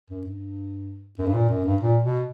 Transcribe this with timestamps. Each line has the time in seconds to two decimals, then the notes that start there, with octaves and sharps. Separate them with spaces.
0.10 F#2
0.25 G2
1.19 F#2
1.26 G2
1.34 A#2
1.49 F#2
1.65 G2
1.81 A#2
2.04 B2